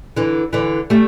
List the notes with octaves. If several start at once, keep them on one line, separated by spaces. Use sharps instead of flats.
D3 E3
D3 E3
G3 A3